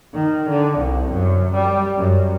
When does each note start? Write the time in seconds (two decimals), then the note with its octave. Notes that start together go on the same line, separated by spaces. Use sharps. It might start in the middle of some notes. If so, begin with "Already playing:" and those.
0.14 D#3
0.49 D3
0.78 C2
1.10 F#2
1.55 G3
1.98 F#2